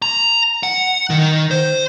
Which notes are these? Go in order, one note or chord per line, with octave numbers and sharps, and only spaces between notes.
A#5
F#5
D#3
C5